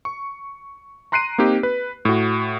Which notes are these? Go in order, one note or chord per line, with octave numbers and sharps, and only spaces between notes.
C#6
A#5 C6 F#6 C7 D7 D#7
A#3 C4 D#4 G4
B4
A2 F#4